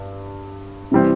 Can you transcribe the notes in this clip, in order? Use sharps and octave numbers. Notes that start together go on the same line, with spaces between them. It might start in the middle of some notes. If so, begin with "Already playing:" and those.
Already playing: G2
C3 E3 G3 C4